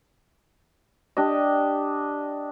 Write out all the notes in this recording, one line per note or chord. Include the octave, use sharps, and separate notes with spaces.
D4 G4 D#5